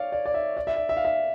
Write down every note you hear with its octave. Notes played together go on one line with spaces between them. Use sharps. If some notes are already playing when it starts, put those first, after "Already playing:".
Already playing: C#5 D5 F5
D5
D5
E5
D5
E5
D5
E5
F5
E5